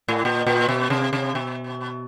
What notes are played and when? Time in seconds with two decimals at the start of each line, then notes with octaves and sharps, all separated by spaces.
0.08 A2
0.25 A#2
0.47 A#2
0.69 B2
0.90 C3
1.13 C3
1.35 B2